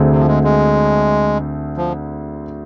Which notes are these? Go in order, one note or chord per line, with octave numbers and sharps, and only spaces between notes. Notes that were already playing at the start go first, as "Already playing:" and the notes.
Already playing: D2 D3 A3 C4 G#4
C3
F3
G#3
G#3
F3